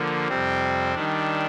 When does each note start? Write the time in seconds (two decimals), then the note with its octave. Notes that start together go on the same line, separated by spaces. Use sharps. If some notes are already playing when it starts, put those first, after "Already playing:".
Already playing: D3 F3 A#3
0.28 F2 C3 G3 C4
0.94 D#3 G3 D4